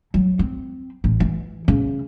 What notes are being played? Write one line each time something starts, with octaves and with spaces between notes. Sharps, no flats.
F#3
C4
A1
E3
C#3